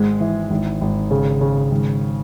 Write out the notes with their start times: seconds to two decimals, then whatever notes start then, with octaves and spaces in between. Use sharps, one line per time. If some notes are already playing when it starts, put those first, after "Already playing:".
Already playing: G#1 G#2 G#3
0.20 E3
0.50 G#1
0.81 G#1
1.11 C#3
1.41 C#3
1.71 G#1